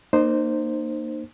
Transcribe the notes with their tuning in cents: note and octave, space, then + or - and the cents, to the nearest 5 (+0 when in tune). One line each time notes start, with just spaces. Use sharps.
A#3 +0 D#4 -35 C5 +0